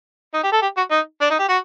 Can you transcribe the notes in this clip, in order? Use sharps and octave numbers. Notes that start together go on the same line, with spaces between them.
D#4
G4
A4
G4
F#4
D#4
D4
D#4
G4
F#4